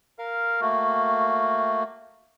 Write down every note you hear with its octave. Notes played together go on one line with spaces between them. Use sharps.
A#4 F5
A3 A#3 F#4